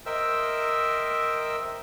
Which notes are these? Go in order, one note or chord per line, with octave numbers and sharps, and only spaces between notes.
A#4 C5 D#5 E5 G5 E6